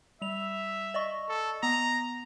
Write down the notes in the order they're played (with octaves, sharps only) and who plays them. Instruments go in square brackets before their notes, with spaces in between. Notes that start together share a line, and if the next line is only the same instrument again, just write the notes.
[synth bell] G3 F7 [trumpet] E5
[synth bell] D5 D#5 C#6
[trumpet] A4
[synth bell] B3 [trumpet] A#5